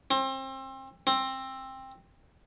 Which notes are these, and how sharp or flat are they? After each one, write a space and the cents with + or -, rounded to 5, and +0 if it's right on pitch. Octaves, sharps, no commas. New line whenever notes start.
C4 +30
C4 +15